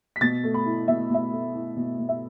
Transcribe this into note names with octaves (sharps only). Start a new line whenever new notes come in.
B6
B2 A6
A3
B5
E4
B2 E5
B2 E5
A3
E4
B2
B2
E5